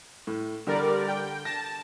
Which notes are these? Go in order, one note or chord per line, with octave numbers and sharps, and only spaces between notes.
A2
D3 G3 A#4 D5
G5
A5 A#6